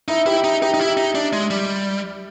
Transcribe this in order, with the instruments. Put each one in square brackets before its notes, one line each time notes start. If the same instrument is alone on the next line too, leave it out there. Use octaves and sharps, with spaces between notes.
[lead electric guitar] D#4 [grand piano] E4
[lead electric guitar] E4 [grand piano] G4
[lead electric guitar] D#4
[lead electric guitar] D#4 [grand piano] G4
[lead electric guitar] D#4
[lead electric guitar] E4 [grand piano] G4
[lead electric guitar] D#4
D4
G#3
G3